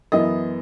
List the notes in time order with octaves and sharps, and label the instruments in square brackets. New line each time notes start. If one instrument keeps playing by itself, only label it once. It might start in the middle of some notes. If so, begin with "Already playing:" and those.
[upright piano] F#2 E3 B3 E4 D#5